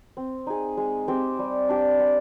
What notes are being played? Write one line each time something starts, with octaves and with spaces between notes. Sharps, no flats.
C4
D#4 G#4
G#3
C4 G4 C5
G3
D4 G4
C4